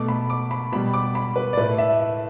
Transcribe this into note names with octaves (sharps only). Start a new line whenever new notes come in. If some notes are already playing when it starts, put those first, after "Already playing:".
Already playing: B2 A3 D6
B5
D6
B5
B2 G3 B5
D6
B5
B4
D5
A2 A3 B4
E5
E5